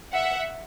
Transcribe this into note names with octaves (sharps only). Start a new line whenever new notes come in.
E5 F#5